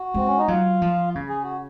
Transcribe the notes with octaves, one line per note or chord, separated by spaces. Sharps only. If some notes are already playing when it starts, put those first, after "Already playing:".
Already playing: F#4
G#3 C4
C#4
D#4
F#3 F4
F3
C#3
G#4
F#4